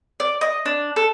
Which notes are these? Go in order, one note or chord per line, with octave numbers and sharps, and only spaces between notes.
D5
D#5
D4
A4